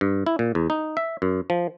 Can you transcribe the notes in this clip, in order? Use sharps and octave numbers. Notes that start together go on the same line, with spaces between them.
G2
E4
A#2
E2
D#4
E5
F#2
F3